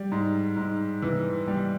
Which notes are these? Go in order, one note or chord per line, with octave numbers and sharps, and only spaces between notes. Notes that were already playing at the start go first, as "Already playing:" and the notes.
Already playing: G3
G#2
G#2
E3
G3